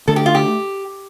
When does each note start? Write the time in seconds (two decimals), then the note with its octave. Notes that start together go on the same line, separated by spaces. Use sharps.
0.08 D3 A3 D4 A4
0.16 G4
0.26 F4
0.35 G4